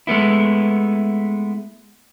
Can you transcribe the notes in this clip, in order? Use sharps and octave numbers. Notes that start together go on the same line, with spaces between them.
G#3 A3 B3 E4